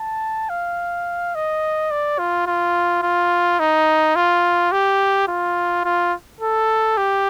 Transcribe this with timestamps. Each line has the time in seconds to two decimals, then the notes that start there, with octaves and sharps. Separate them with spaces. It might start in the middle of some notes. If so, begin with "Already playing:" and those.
Already playing: A5
0.50 F5
1.35 D#5
1.91 D5
2.19 F4
2.47 F4
3.02 F4
3.60 D#4
4.16 F4
4.72 G4
5.28 F4
5.85 F4
6.41 A4
6.97 G4